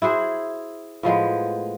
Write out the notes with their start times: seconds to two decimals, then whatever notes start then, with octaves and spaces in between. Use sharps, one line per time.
0.02 E4 F#4 G#4 C5
1.03 A2 F3 G#3 B3